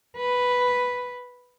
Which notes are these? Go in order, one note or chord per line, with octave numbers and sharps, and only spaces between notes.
B4